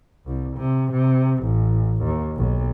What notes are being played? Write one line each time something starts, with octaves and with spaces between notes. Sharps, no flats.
C2
C3
C3
A1
D#2
B1